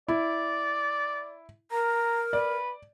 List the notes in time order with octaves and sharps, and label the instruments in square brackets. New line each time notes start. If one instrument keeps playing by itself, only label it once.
[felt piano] E4 [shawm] D5
[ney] A#4 [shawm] A#5
[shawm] B4 [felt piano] D5